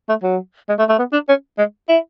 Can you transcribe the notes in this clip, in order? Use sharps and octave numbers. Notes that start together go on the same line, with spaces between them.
A3
F#3
G#3
A3
A3
B3
D4
C#4
G#3
E4